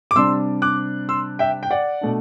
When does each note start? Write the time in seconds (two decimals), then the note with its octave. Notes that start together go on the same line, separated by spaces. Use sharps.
0.11 D6
0.16 C3 G3 D4 C6 E6
0.62 D6 F#6
1.09 C6 E6
1.39 E5 G5
1.63 G5
1.71 D5 F#5
2.01 B2 A3 D4